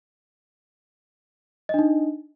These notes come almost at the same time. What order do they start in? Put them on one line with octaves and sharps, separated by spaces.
D#5 D4 D#4